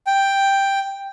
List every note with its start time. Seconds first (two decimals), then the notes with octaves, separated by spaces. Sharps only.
0.07 G5